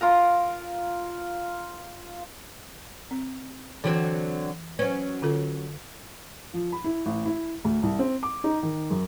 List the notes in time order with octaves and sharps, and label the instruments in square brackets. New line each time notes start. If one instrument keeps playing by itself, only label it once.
[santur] F4 A#4 A#5
[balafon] C4
[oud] D3 F#3 C4 [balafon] E3 G5
[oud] F#3 C#4 [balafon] B4 C5
[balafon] D3 F4 A4
[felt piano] F3
B5
E4
A1
E4
D2
C2
C4
D6
D#4
D#3
F#2